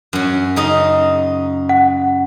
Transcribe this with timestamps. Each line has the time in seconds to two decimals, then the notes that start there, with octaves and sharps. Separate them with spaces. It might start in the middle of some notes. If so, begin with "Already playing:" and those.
0.13 F#2 C#4
0.56 C#3 D#4 D#5
1.69 F#5